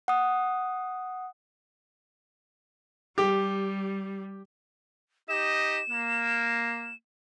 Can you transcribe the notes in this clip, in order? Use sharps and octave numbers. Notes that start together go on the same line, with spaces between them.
F#5 D#6
G3 G4
D#4 G4 D#5 E7
A#3